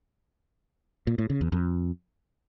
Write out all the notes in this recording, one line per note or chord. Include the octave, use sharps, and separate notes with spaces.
A#2
A2
C#3
E2
F2